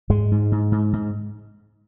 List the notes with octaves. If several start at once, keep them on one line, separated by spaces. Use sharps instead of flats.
G#2 G#3
G#2
G#2
G#2
G#2